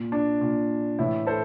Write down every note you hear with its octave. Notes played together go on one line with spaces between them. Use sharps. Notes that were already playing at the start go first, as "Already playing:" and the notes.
Already playing: A#2
D4
A#2
A2 E3 E4
A4 C5